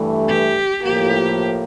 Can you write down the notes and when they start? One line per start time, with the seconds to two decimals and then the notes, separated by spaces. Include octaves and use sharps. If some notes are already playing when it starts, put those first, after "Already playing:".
Already playing: G2 E3 A3
0.28 G4
0.83 A2 F3 A#3 G4